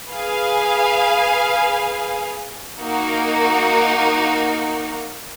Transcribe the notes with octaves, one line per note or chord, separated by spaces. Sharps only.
G#4 B4 F5 G#5
A#3 D#4 F#4 A#4